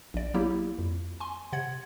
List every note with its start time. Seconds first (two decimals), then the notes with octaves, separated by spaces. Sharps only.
0.14 A#1 D5
0.34 F#3 A#3 E4 G4
0.79 F2
1.20 G#5 C6
1.53 C3 F#5 G#6